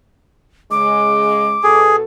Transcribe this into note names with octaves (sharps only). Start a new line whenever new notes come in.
C#3 G#3 D6
B2 G#4 A4